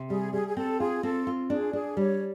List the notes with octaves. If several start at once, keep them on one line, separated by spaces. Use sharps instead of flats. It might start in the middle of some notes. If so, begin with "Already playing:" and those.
Already playing: C3
G3 G#4
G3 G#4
G#4
C4 A4
F4 G#4
C4 A4
F4
D4 G#4
D4 G#4
G3 C#5